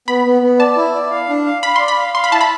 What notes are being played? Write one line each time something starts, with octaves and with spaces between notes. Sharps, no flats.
B3 B5
B3
B3
D5 A5
E4
D5
F5
D4
F5
F5 B5
D5 C6
B5
F5
F5 C6
B5
E4 A5
B5